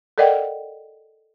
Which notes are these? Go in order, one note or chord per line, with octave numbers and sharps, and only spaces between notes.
A4 A#4 D5 D#5 F#5 G5